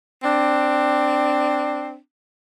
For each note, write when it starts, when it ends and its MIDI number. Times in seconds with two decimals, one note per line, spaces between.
0.22 1.98 60
0.22 1.98 62